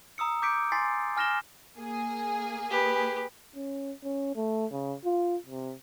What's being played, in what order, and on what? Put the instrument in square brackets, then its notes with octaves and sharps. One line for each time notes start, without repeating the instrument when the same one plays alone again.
[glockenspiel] A#5 D#6 E6 C#7
D6 G6 B6 C#7 D7
G#5 C6 A6 B6 C7
G#5 F6 A#6 E7 G7
[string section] A#3 G#4
[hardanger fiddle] G4 B4
[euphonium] C#4
C#4
A3
C#3
F4
C3